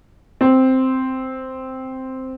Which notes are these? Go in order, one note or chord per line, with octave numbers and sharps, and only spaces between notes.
C4